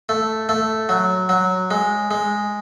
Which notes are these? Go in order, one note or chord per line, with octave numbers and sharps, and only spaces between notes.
A3
A3
F#3
F#3
G#3
G#3